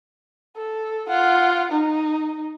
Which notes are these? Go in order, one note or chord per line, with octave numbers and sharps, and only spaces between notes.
A4
F4 F#5
D#4